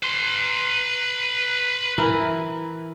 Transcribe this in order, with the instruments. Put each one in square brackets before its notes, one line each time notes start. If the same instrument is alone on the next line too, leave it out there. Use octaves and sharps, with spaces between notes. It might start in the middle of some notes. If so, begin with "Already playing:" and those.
[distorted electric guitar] B4 C6
[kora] E3 E4 A#4